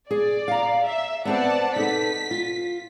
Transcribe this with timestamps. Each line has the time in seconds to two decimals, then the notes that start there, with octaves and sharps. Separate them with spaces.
0.11 G#4 D5
0.48 F5 A#5
0.86 E5
1.25 B3 C4 B4 D5 F#5 A5
1.76 D#4 A4 B4 B6
2.31 F4